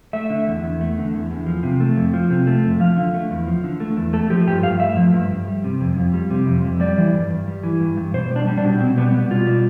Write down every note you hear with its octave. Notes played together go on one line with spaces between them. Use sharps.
A3 E5
D3
E2
E2
A3
D3
E2
E2
F3
C3
A3
F2
F3
C3
A3
F2
F3 F5
D3
A3
E2
F3
D3
A3
E2
A3 A4
F3 G4
G2 G4
G2 F5
A3 E5
F3
G2
G2
G3
C3
F2
F2
G3
C3
F2
F2
G3 D5
E3
G2
G2
G3
E3
G2
G2
B2 C5
G3
D4
G3
D4
B2
B2 C4
G3 B3
G3 B3
B2 F4
G3